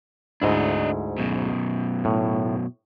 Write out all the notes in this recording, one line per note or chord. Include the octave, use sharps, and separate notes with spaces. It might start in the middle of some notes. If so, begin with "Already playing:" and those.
D2 G#2 D4 E4 D#5
F#2 B2
A2